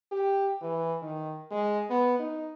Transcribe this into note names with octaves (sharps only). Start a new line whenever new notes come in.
G4
E3
D#3
G#3
B3
D#4